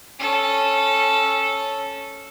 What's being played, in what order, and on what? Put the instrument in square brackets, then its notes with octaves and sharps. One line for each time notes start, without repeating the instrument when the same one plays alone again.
[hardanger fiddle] C#4 A4